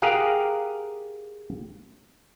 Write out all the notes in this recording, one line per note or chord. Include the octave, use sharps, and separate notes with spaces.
G4 G#4 A#4 F5 F#5